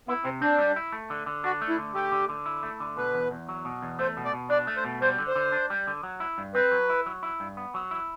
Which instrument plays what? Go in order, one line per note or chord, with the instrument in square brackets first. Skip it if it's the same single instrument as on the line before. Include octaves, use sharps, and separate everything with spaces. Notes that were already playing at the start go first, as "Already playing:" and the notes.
[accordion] B3 [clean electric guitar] E4
[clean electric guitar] C3 [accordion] C4
[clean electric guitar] C4 [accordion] D4
[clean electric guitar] G3
E4
A3
D3
D3
[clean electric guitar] D4 [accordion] F#4
[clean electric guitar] A3
[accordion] E4
[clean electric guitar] D3
[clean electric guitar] A3 [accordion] G4
[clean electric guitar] D3
D3
E4
A3
D3
[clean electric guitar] B2 [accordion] B4
[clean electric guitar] E2
E2
F#3
B2
E2
[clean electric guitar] A3 [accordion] C5
[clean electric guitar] B2
[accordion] D5
[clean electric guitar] B2
[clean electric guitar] D4 [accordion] D5
[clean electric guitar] A3
[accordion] C5
[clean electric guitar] B2
[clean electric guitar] G3 [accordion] C5
[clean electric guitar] D3
[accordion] C5
[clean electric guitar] D3
D4
G3
D3
F#3
E4
G2
[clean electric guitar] C4 [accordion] B4
[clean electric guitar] F#3
E4
F#3
E4
G2
B3
F#3
E4